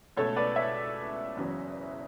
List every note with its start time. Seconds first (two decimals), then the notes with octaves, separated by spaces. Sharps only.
0.17 C#2 B2 A3 A4 C#5
0.36 B4 D5
0.56 C#5 E5
1.37 F#1 E2 C#3 F#3